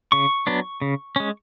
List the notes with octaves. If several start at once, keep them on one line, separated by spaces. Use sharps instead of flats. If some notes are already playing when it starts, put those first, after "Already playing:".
C#3 C#6
F#3 B3 D4
C#3
G#3 C#4